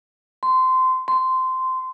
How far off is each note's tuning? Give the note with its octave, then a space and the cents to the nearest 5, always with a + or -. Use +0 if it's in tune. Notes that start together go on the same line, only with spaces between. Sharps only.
C6 -20
C6 -15